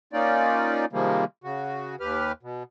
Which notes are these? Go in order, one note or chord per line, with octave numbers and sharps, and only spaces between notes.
A#3 C#4 D#4 F4 D5
C3 D#3 F3 G3 G#3 A#3
C#3 F#4
D#2 G4 B4 F6
B2